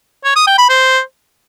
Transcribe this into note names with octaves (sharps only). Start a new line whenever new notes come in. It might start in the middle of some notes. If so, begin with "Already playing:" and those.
C#5
D#6
G5
B5
C5